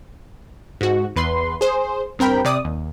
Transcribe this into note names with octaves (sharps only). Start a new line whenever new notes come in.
G#2 F#4
E2 B4 C6
G#4 C5
G2 C4 A#4 G5 B5
C3 D5 D#6
D#2